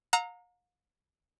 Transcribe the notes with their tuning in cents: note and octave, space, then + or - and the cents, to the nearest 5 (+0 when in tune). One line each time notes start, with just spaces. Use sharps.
F5 +45 A#5 -10 E6 -30